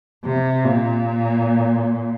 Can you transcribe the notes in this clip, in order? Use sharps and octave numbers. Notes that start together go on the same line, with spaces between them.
C3
A#2